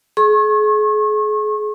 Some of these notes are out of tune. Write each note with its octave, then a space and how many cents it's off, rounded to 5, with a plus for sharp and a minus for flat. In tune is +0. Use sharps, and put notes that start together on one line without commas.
G#4 +35 C#6 -35